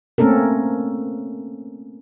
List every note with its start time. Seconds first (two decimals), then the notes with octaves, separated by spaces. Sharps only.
0.18 A3 A#3 C4 C#4 A4 A#4